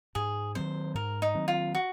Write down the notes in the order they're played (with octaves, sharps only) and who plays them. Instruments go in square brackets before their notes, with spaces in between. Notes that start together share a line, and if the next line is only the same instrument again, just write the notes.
[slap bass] G#2 [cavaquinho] G#4
[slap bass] D#3 F#3 C4 [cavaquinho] C5
[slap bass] G#2 [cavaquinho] A#4
[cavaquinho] D#4
[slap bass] D#3 F#3 C4
[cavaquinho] F4
F#4